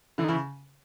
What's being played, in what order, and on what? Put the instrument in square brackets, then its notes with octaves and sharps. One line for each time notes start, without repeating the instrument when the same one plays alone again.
[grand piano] D3 [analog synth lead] E3
[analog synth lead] D#3
[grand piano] C#3 [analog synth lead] E3